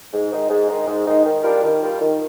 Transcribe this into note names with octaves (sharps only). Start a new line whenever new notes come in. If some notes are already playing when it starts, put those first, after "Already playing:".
G#2
D#3 G#3 D#4
G#2
D#3 G#3 D#4
G#2
D#3 G#3 D#4
D#3
G3 D4 F4 A#4
D#3
G3 D4 F4 A#4
D#3